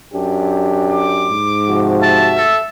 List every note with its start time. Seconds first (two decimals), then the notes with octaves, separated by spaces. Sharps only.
0.13 F#2 D4 G4
0.90 D6
1.29 G#2
1.68 C3 F3 F#4
2.03 E5 A5
2.37 A4